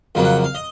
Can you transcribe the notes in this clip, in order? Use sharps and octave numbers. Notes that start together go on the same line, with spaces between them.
F2 C#3 F#3 A#3
F#5
F5
D#5